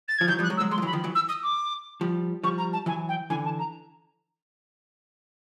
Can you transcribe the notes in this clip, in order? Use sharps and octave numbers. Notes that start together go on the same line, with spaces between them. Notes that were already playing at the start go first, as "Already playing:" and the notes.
A6
F3 G#6
E3 F#3 G6
F3 G3
F#6
F#3 G#3
E6
F#3 G#3
F#3 G#3 C6
F3
E3 F#3
B5
D#3 F3
E3 F#3
E6
D#6
D6
F3 G3
F3 G3 C#6
A#5
A5
E3 F#3 G#5
G5
D3 E3 G#5
A5
A#5